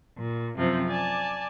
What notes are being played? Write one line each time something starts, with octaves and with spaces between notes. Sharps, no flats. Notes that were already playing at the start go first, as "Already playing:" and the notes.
A#2
F#2 C3 F3 C4
D5 G#5 A5